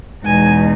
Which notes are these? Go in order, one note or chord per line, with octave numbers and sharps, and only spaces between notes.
E2 B2 G#3 D#4 G#5